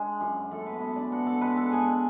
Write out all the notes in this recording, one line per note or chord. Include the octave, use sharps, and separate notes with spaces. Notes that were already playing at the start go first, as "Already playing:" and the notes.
Already playing: G#3 D4 G#4
F#2
F#2 A3 A4
B3 B4
G#3 B3 B4
D4 D5
B3 F#4 F#5
A4 A5
G#3 B4 B5
A4 A5
G#3 G#4 G#5